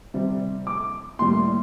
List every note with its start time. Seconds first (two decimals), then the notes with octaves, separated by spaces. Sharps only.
0.14 C3 G3 C4
0.67 D6
1.19 A2 G3 A#3 C6